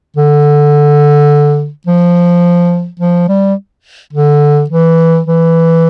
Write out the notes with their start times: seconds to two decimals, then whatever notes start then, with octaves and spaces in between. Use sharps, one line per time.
0.16 D3
1.87 F3
2.99 F3
3.28 G3
4.13 D3
4.70 E3
5.26 E3